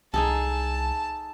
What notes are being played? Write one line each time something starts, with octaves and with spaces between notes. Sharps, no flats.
C2 D#4 G#4 A4 A5